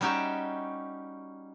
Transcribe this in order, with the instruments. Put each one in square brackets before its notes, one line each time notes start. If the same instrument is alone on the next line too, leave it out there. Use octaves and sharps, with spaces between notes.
[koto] G3 C#4 D#4 F#4 G4 E5